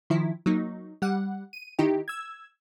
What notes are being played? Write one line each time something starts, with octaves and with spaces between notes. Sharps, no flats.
D#3 F3 E4
F#3 A#3 D#4
G3 F#5
D#7
D#3 D#4 E4 G4
E6 G#6